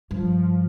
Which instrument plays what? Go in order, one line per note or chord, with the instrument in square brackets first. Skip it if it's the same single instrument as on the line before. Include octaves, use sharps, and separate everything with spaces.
[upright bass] G2 [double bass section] F3